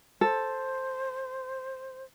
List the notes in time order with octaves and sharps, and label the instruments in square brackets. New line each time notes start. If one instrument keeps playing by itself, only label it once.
[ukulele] A4 [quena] C5